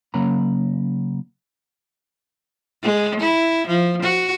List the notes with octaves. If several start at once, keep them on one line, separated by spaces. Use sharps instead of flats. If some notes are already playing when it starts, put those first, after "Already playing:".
C#3 F#3 A#3 C#4 A#5 B5
G#3
E4
F3
F#4